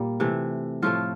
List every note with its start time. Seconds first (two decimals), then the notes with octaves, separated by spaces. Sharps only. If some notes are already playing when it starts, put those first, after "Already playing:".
Already playing: A#2 G3 A#3
0.20 C3 E3 A3
0.83 A2 F3 A3 F4